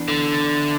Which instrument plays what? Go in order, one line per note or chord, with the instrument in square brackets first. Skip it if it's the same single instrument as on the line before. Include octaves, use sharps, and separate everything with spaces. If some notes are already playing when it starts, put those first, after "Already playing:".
Already playing: [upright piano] E3 B3 D4
[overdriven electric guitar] D3